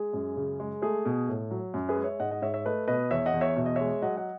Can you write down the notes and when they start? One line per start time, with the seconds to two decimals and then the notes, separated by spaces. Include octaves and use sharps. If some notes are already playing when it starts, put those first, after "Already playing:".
Already playing: G#3 G#4
0.13 F#2
0.36 C#3
0.60 G#3
0.82 A3 G#4
1.05 B2
1.28 A2
1.51 F#3
1.74 F#2
1.89 G#4 B4
1.96 G#3
2.04 C#5 E5
2.20 G#2 D#5 F#5
2.31 D#5 F#5
2.42 G#2 C#5 E5
2.54 C#5 E5
2.65 A3 B4 D#5
2.88 B2 B4 D#5
3.11 E2 C#5 E5
3.26 D#5 F#5
3.34 E2
3.41 C#5 E5
3.56 B2 E5
3.66 D#5
3.76 G#3 C#5 E5
4.02 F#3 D#5 F#5
4.17 D#5 F#5